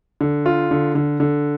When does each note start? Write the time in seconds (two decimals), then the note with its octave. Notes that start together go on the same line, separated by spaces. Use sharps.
0.21 D3
0.46 F4
0.71 D3
0.95 D3
1.20 D3